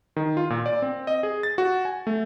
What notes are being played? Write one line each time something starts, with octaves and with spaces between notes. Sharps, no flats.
D#3
F4
A#2
D5
C4
D#5
G#4
A6
F#4
G#5
A3